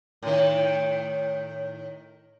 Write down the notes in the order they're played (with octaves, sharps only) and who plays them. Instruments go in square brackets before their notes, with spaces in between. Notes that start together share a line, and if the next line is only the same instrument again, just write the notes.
[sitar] A2 D#3